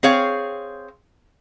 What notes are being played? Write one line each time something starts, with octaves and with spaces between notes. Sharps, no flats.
C4 G#4 C#5 F5